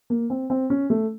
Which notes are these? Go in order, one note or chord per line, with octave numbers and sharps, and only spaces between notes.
A#3
C4
C4
C#4
A3